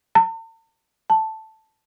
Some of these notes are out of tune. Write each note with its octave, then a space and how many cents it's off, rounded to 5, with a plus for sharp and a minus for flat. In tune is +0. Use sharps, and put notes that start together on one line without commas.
A5 +45
A5 +0